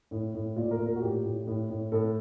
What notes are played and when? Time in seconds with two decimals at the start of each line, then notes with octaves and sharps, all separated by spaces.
0.11 A2
0.34 A2
0.56 A#2 D5
0.71 A#4
0.79 A#2
0.86 A#4
0.96 F#4
1.02 A2 G4
1.24 A2
1.47 A2
1.69 A2
1.92 A2 A4